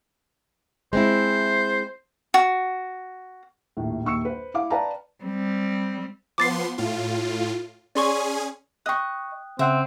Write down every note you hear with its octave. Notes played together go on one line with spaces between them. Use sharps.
G#3 C4 E4 C5
F#4
A#1 D#2 A2
A#1 D#2 C#6 E6 C#7
B4 C5
E4 F5 D6
B4 D5 F5 G5 A5 A#5
G3 C4
F3 B3 C6 D6 A6 C7
A2 F4
C#4 G#4 D5 G#5 C6 C#6
D#5 G5 C#6 D#6 F#6
C#3 C4 E5 F#5